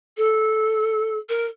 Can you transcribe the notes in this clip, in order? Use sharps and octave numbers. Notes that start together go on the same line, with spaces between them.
A4
A#4